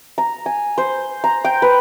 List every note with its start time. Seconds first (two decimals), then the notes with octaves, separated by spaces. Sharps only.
0.18 A#5
0.46 G#5
0.78 C5
1.24 A#5
1.45 G5
1.62 B4